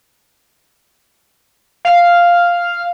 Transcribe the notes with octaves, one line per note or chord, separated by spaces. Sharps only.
F5